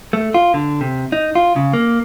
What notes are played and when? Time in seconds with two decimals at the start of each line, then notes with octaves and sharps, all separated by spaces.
0.13 A3
0.34 F4
0.54 D3
0.81 C3
1.12 D#4
1.35 F4
1.56 C#3
1.73 A#3